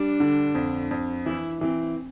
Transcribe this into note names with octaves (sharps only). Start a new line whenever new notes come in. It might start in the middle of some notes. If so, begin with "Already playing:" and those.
Already playing: G3 D4
D3
F2
F2
E3 E4
E3 C4